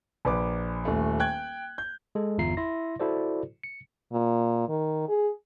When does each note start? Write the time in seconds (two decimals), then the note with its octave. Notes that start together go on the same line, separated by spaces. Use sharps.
0.25 A#1 B4 D6
0.85 D#1 A3
1.20 G5 F#6 G#6
1.78 G6
2.15 G#3 A4
2.38 G1 E2 F4 E5 A#5 C7
2.57 E4 E5 C6 A#6
3.00 E4 F#4 A4 C5 D5
3.63 C#7
4.13 A#2
4.69 D#3
5.09 G#4